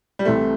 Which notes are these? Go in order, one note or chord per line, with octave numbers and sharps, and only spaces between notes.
G3
C2 C3 E3 A3 C4